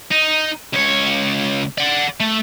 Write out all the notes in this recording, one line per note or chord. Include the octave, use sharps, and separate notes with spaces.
D#4
C#2 C#5
D5 F#5
A3